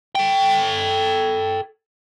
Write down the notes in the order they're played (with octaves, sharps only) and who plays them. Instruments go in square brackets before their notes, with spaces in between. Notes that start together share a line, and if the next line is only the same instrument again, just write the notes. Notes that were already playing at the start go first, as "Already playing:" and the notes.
[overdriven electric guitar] A4 G5